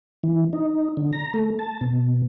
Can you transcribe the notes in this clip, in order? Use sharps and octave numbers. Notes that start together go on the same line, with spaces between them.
E3
D#4
D3
A#5
A3
A5
B2